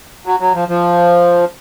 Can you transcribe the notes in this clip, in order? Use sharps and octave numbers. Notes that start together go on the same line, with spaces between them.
F#3
F#3
F3
F3